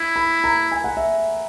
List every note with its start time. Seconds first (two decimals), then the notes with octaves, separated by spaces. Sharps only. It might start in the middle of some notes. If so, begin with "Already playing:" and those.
Already playing: E4
0.16 B5
0.44 A#5
0.72 G#5
0.84 F#5
0.97 E5